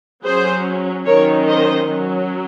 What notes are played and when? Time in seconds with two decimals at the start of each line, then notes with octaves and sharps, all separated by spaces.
0.24 F#3 C#4 G#4 C5
1.06 D#3 F#3 C#4 A#4 C#5
1.47 C5 D#5
1.88 F#3 C#4